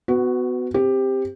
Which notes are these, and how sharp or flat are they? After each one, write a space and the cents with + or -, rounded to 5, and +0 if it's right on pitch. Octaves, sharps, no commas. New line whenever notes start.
B3 +25 F#4 +0
C4 +0 G4 +10